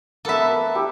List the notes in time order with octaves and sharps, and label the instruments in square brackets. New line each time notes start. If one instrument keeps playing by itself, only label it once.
[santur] A#3 B3 [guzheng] A4 E5
[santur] A#4 B4
D4 E4 G4